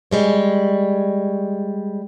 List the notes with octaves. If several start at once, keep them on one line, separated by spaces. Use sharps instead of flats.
G3 G#3 C#5